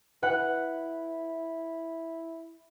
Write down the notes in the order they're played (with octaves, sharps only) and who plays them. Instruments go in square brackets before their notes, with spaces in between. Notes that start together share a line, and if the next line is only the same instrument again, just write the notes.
[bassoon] E4 [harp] B4 F#5